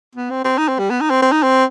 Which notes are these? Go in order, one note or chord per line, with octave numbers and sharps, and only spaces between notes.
B3
C4
C4
D#4
C4
G3
B3
D#4
C4
C4
D#4
C4